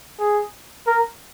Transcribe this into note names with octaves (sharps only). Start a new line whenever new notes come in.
G#4
A#4